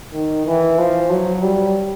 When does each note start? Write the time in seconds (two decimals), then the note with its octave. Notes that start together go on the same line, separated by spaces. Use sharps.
0.13 D#3
0.46 E3
0.78 F3
1.10 F#3
1.42 G3